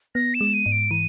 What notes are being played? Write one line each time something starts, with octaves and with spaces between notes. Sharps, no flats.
B3 A#6
E7
G#3
D#7
G#2
D7
E3 D#7